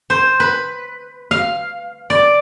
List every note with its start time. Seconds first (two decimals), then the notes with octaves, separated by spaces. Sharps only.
0.10 C5
0.40 B4
1.31 F5
2.10 D5